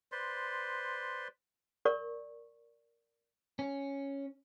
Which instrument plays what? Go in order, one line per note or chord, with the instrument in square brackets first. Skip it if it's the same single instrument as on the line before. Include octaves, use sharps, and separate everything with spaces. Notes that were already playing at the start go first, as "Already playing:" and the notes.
[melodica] B4 C5 D5 C6
[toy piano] A#4 D5 C#6
[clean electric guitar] C#4